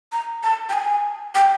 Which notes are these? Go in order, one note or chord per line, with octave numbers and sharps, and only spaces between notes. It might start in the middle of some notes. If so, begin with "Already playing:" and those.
A#5
A5
G5
G#5
G5